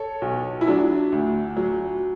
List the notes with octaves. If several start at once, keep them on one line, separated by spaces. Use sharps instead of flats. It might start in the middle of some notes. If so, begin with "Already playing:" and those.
Already playing: A4 C#5
B1
E4
F#3 D4
D2
F#3